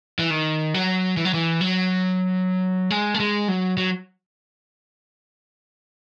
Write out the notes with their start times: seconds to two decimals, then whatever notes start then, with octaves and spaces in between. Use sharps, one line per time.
0.19 E3
0.31 D#3
0.74 F#3
1.17 E3
1.25 F#3
1.34 E3
1.61 F#3
2.90 G#3
3.14 A3
3.20 G#3
3.48 F#3
3.77 F#3